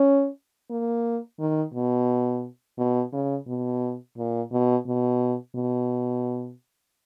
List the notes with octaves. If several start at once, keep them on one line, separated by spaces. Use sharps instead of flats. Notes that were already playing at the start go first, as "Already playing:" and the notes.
Already playing: C#4
A#3
D#3
B2
B2
C#3
B2
A#2
B2
B2
B2